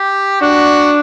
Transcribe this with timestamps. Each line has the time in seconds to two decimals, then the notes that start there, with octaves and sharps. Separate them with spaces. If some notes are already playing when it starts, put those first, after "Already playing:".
Already playing: G4
0.41 D4 F#4